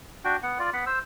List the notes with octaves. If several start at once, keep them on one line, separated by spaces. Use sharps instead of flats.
D4 F#4 G5
B3 F#5
F4 D5
B3 F#5 B5
C5 E6